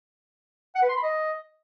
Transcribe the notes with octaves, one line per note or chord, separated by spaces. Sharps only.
F#5
B4
C6
B5
D#5